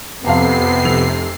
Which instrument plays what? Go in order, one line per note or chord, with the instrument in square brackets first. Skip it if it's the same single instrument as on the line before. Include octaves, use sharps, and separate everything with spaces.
[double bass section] F2 [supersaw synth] C3 C7 [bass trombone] B3 [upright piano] F5 A5 A#5
[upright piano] F1 E6 F7